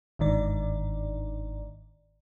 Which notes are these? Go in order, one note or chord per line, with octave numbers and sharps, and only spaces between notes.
G1 G#2 D#3 D5